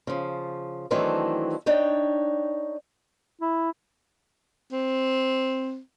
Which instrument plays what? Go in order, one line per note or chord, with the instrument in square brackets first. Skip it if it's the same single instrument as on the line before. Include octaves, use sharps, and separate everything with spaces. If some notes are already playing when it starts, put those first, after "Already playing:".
[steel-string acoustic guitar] C#3 F3
D#3 E3 F#3 A3 C4 D4
D4 D#4 C#5 G5
[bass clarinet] E4
[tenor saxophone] C4